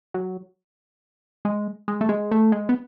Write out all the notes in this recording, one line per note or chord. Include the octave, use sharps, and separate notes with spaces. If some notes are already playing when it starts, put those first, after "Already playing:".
F#3
G#3
G#3
A3
G#3
A3
G#3
B3